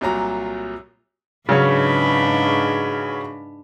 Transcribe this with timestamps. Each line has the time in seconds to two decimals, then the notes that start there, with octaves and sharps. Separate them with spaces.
0.01 C2 A#2 F#3 A#5
1.49 G#2 C#3 F#3 C#4 D4 B4